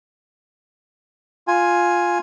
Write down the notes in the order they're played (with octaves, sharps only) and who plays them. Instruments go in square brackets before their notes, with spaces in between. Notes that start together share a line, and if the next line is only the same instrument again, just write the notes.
[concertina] F4 G#5